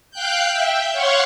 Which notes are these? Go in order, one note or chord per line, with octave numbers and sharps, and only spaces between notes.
F5 G5 F#6 G6
E5 G5
C#5 F5 F#5 C6 C#6